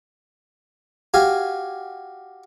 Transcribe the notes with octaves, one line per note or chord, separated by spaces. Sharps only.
F#4 G4 F5 G#5